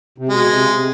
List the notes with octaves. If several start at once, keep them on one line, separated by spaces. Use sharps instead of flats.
C3
B2 G#3
C3
C#3
C3